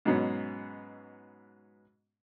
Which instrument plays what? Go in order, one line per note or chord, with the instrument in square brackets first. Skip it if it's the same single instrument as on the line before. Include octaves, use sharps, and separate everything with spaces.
[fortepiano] G#2 B2 F#3 B3 C#4